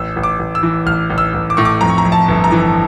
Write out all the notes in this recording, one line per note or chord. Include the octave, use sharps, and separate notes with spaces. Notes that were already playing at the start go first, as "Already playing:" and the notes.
Already playing: A1 E6
A1
D6
A1
E6
E3
A1 F6
A1
E6
A1
D6
A2 C#6
D6
F2 A#5
C#6
A#5
F2
A5
G1
A#5
E3